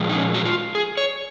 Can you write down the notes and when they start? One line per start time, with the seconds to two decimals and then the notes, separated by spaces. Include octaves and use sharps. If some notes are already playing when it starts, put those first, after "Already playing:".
Already playing: A#2 F3 G#3
0.09 D#4
0.15 C#4
0.34 F#4
0.45 F4
0.75 G#4
0.97 C#5